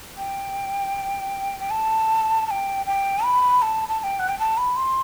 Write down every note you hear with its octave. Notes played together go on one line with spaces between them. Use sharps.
G5
G5
A5
A5
G5
G5
B5
A5
A5
A5
G5
F#5
G5
A5
B5
C6